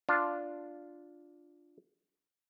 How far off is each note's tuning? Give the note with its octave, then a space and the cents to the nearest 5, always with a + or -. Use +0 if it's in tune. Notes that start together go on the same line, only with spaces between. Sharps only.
D4 +0 F4 +0